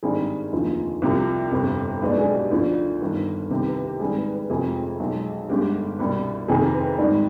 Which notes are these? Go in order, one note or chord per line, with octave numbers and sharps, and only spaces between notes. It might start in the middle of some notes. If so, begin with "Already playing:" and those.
G#1 G2 D#3 G3 C4 G#4
F1 D#2 D3 F3
C2 C3 F3
G1 F2 C3
B1 B2 G#3 D4 B4
G#4
G4
D2 D3 F3 B3 D4
G1 G2 D#3
C2 C3 D#3 B3 G4
B4
G4
G#2 D#3 G3 C4 G#4
B4
B4
F1 F2 C3 F3 G#3 G#4
B1 B2 G#3
G1 G2 D3 G#3 B3 G4
C2 B2 G3
F2 C3 D#3 G#4
B4
G#1 G#2 D#3 G3 D5